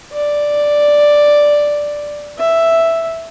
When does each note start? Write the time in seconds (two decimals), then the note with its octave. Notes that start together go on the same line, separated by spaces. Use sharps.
0.13 D5
2.39 E5